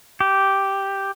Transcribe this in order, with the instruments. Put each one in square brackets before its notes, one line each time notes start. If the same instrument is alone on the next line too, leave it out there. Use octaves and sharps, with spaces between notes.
[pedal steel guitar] G4